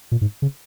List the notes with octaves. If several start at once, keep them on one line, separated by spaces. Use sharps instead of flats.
A#2
G#2
C#3